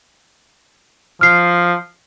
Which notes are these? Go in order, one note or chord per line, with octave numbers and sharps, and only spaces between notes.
F3 F6 C7